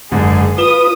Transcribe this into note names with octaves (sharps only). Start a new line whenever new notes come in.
F#1 G#2 D3 G#4
F4 B4 D#6 E7 G7